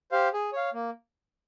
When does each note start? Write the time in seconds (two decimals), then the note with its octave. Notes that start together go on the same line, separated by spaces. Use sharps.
0.12 G4 C5 F5
0.33 G#4
0.53 C#5 F5
0.74 A#3